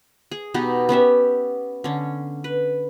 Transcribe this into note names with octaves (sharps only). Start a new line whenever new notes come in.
G#4
B2 B3 D#4 G4
B3 C#4 G4 E5
D3 C#4
B4